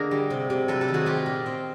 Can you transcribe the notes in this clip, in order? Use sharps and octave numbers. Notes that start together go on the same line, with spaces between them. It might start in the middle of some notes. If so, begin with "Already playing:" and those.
Already playing: D3 A#3 D#4 G#4 A#4
G3
C3
C3
F#3 A4 B4
G4 A4
D#3
F#4 G#4
D#4 F4 G4
A#2
C4